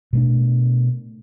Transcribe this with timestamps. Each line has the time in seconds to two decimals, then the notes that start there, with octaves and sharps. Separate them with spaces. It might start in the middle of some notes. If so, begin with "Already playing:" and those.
0.13 B2 A3 D4